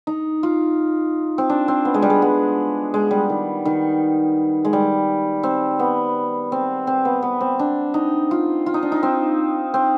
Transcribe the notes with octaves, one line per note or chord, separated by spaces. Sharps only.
D#4
F4
C4
D4
C4
B3
G#3
G3
G#3
B3
G#3
G3
D#3
D#3
G#3
G3
C4
B3
C4
C4
B3
B3
C4
D4
D#4
F4
F4
D#4
D4
D#4
C4
C4